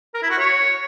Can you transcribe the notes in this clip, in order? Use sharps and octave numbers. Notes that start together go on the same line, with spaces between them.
A#4
E4
F#4
C#5